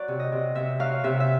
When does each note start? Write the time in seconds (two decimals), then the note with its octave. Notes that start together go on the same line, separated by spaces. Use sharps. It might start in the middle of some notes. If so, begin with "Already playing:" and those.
Already playing: F#3 D5
0.08 C3
0.20 D#5
0.32 C3
0.55 C3 E5
0.79 F#3 F5
1.04 C3 E5
1.20 E5